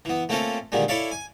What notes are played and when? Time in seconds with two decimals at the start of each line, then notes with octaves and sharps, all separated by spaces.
0.05 E3 B3
0.29 A3 A#3 C4 C#4 F4 A4
0.72 A#2 D3 D#3 G3 G#3
0.88 E4 A4 C#5 D5 E5 F5
1.11 G#5